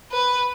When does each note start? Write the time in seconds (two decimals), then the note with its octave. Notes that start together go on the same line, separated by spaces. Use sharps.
0.12 B4